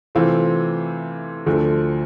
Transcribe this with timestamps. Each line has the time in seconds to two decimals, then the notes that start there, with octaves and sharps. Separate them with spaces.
0.15 C3 E3 A3 C4 F4
1.46 D2 D3 F3 A3